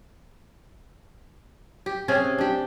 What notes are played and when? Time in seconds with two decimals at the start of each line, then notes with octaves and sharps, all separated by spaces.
1.86 G4
2.08 C3 C4 C#4 G#4
2.38 D4 G4